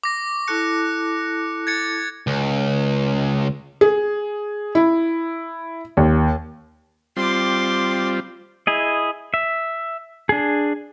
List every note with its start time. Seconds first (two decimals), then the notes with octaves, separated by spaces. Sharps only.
0.03 D6 A#6
0.29 C#6
0.48 E4 A4 A5 F#6 C#7
1.67 G#6 A6 C#7
2.27 C#2
3.81 G#4
4.75 E4
5.97 D#2
7.17 G3 C4 F4 C6 D6
8.67 E4 G#4 D#5
9.34 E5
10.29 D4 G#4